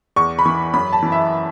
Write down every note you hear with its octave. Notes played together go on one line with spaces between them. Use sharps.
E2 C#6
B5
E3 C#6
F#2 B5
A5
E3
E5